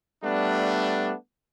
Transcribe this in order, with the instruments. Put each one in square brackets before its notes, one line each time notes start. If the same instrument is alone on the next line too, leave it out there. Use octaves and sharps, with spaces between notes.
[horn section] G3 A3 B3 D4